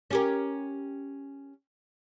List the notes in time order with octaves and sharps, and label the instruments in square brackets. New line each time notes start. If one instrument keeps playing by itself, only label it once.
[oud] C#4 G4 A#4